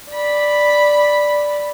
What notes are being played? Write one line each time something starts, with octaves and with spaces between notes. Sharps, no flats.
D5 B5